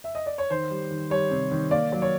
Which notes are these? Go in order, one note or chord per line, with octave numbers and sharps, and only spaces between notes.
E5
D#5
D5
C#5
D#3 C5
G3
D#3
G3 C#5
C3
D#3
A#3 D5
F#3
C#5